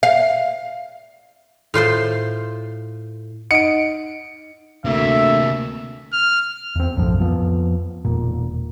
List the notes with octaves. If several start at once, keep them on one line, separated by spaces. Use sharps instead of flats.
F5
A2 F4 C5 C6
D#4 D#5 F#5 C#7 D7
D2 C3 A#3 E5
F6
E2 C4
B1 F#2 A2 F3
F2 F3 B3
E1 A#2